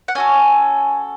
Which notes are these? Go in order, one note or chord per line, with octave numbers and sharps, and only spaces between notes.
F#5
C#4 F#4 A4 G#5